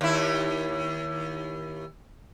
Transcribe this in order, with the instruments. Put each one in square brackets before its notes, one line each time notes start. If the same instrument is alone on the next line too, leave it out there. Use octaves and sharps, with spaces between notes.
[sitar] D#2 E4